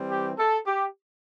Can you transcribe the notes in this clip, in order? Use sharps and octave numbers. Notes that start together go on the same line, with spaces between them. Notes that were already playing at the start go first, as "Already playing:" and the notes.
Already playing: E3 G3 C4
G4
A4
G4